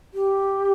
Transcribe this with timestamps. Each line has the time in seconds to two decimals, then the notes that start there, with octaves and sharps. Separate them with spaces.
0.14 G4